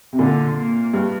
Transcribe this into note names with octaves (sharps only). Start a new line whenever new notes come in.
C3
A#2 D3
A#3
G2